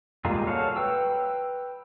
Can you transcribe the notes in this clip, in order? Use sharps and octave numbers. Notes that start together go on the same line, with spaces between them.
G3 G#3 A#3 F4 G#4
F#4 A4 C#5 F5
B4 G5 E6